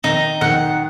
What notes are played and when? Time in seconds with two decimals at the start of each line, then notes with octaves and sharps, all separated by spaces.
0.04 D#3 D#4
0.41 D#3 F#5